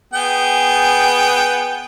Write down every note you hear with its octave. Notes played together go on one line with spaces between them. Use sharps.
B3 G#4 G5